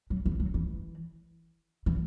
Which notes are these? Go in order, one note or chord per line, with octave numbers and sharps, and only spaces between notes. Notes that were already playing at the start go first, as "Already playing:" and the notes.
F#3
E3
F#3
E3
E3